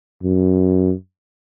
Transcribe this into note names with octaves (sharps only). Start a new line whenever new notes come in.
F#2